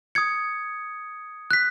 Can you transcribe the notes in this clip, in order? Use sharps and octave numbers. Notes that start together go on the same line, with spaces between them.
D#6 G#6 C#7
F#6 B6